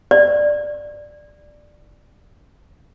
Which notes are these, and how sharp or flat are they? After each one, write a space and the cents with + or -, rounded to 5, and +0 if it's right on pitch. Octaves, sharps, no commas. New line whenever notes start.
D5 +10